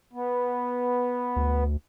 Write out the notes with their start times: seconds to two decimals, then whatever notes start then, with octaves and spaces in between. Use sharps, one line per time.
0.13 B3
1.36 D2